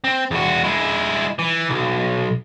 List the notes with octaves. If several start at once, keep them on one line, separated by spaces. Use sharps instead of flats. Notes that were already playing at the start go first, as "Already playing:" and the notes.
C4
E2 F#4
G#3 E4
E3
B1